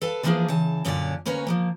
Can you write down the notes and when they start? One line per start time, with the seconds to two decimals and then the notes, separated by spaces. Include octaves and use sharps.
0.02 A4 B4 F5 A5
0.23 D3 E3 F3 A#3 D4 G#4
0.48 C#3 E3 A5
0.85 F#2 A#2 D3 C#4 G4 D5
1.26 D2 A#3 C#4 A#4 B4 C#5
1.47 F3 F#3 A#3